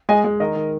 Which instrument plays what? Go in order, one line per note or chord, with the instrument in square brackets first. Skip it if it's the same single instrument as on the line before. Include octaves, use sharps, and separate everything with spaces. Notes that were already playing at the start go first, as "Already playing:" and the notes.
[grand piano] G#3 [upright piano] D#5 G#5
[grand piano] G#3
[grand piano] D#3 [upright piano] A#4 D#5
[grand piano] D#3